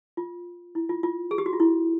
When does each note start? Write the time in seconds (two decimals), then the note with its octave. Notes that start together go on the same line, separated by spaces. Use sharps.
0.17 F4
0.75 E4
0.89 F4
1.03 F4
1.31 G#4
1.38 G4
1.46 F#4
1.53 F4
1.60 E4